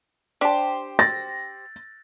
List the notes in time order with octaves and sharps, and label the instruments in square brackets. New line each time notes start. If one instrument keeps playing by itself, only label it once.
[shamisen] D4 A5 [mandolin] G4 C5
[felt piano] A6 A#6